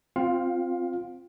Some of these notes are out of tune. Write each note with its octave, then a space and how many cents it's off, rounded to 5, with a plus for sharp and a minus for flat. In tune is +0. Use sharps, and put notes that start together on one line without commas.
C4 +0 F4 +0 F5 +25